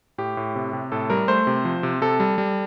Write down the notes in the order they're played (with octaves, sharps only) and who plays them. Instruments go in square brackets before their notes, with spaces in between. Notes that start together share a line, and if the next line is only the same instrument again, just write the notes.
[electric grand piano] A2 G4
A2
C3
C3
A2 A4
G3 A#4
A3 C5
C3
F3
C3
C3 A4
G3
G3